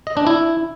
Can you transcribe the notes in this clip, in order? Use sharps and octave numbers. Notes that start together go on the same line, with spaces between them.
D#5
D4
E4